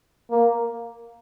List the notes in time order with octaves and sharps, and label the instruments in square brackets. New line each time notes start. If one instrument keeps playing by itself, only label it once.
[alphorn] A#3